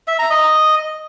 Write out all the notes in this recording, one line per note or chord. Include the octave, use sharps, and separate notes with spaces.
E5
A#5
D#5